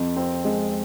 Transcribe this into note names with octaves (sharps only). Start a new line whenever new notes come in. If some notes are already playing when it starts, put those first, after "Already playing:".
Already playing: F2
C4
G#3